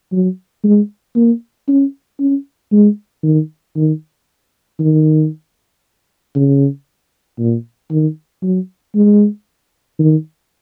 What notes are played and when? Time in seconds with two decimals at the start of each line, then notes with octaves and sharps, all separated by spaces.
0.12 F#3
0.64 G#3
1.16 A#3
1.68 C#4
2.20 C#4
2.72 G#3
3.23 D#3
3.76 D#3
4.80 D#3
6.35 C#3
7.39 A#2
7.91 D#3
8.42 F#3
8.95 G#3
9.99 D#3